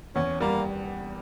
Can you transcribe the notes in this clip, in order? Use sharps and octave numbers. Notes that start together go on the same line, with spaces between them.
E2 C#4
G3 A#3